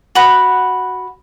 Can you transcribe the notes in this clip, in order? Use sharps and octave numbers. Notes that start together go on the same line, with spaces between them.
F#4 F#5 B5